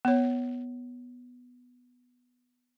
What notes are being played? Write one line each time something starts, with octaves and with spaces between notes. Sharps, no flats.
B3 C#5